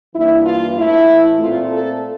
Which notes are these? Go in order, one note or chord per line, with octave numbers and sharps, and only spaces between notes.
G2 E3 A#3 D4 E4
F4
A2 E3 A3 E4
A#2 A3 C4 F4
A4